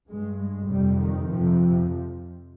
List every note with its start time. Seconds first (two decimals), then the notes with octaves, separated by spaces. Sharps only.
0.10 G2 G#3
0.40 G#3
0.69 F2 C3 G3
0.99 D#3
1.29 F2 C3 F3